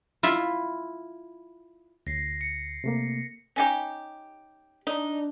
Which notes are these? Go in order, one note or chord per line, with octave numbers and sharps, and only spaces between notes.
E4 F4 E5
D2 A#6 C7
C#7
C3 A3 A#3
C#4 D#4 G4
D4 D#4